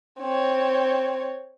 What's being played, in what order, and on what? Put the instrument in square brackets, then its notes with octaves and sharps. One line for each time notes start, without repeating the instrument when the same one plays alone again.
[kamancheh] C4 C#5